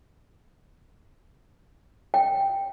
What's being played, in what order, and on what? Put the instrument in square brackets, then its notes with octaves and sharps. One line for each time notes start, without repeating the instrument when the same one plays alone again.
[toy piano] G5